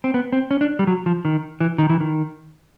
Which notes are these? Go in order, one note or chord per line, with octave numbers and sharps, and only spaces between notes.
C4
B3
C4
C#4
D4
G3
F#3
F3
D#3
E3
D#3
E3
D#3